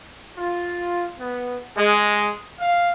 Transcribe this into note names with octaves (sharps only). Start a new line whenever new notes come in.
F4
B3
G#3
F5